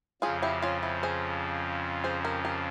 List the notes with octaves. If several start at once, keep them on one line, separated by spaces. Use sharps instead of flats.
F2 C#3 F3 F4 G#4
E4 G4
C#4 F4
C4 E4
G#4 C5
G#4 C5
G4 A#4
G4 A#4